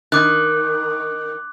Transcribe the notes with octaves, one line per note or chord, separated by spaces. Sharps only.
D#3 D6 F#6